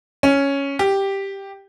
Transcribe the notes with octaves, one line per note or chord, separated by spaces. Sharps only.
C#4
G4